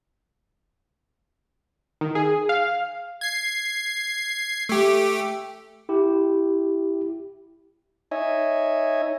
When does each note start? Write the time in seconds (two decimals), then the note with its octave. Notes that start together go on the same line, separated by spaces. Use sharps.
2.01 D#3
2.15 G#4
2.49 F5
3.21 G#6 C7
4.69 A3 G4
5.89 E4 G4
8.11 D#4 C#5 D#5 E5 G#5